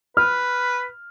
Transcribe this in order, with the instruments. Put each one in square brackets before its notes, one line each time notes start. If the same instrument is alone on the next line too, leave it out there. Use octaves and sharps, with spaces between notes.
[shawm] B4 [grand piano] F6